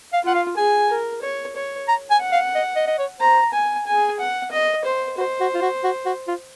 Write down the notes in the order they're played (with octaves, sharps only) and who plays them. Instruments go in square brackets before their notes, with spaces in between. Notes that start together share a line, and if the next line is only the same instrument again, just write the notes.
[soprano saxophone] F5
[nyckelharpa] F4 [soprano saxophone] F#5
[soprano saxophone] F5
[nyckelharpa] G#4 [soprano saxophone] G#5
[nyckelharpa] A#4
C#5
C#5
[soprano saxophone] A#5
G#5
[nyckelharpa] F#5
[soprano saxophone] F5
D#5
D#5
D#5
C#5
[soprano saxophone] C5 [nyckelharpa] A#5
[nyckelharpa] G#5
[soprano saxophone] G#4 [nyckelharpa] G#5
[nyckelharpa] F#5
D#5
C5
[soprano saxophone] F#4 [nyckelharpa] C5
[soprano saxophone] F#4
F4
F#4
F#4
F#4
F4